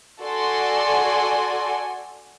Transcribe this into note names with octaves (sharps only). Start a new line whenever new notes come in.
F#4 A4 D5 G#5 C6